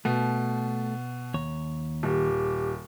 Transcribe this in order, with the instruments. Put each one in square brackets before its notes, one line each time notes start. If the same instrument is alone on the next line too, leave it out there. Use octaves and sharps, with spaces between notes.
[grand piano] B2 [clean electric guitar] A3
[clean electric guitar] D#2 C#5
[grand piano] D#1 [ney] G4